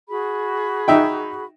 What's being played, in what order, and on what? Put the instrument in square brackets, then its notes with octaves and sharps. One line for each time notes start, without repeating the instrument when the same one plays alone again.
[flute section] F#4 G#4 B5
[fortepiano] D#4 E5 G5